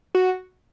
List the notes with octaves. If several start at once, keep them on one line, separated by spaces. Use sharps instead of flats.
F#4